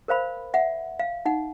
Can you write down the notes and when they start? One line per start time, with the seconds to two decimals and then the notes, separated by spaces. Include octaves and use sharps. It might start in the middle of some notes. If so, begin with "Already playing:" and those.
0.08 A#4 C5 F5 B5
0.54 E5 F#5
0.99 F5
1.26 D#4 F#5